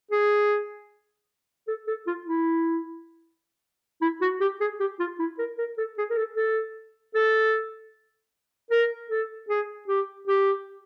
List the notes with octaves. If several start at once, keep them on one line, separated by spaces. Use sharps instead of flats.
G#4
A4
A4
F4
E4
E4
F#4
G4
G#4
G4
F4
E4
A#4
A#4
A4
G#4
A#4
A4
A4
A4
A#4
A4
G#4
G4
G4